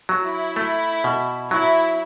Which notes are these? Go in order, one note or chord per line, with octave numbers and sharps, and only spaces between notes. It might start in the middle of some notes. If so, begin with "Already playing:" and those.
F#3
E4
A3
B2
F#3 E4